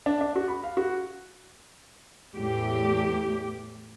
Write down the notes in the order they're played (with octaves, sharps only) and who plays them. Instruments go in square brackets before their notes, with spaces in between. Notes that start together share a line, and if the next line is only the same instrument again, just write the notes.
[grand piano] D4
D4
F#4
B5
F5
F#4
[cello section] E2 A2 G4